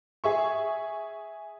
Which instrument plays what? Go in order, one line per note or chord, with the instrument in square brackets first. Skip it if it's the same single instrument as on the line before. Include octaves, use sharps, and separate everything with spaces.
[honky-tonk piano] G#4 E5 C#6